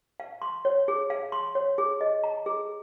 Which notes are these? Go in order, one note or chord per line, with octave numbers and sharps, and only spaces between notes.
F5
C6
C#5
G#4
F5
C6
C#5
G#4
D#5
A#5
G#4